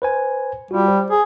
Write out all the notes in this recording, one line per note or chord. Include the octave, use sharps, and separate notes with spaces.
B4 C5 G#5
G3 F4 F#4
C5
G#4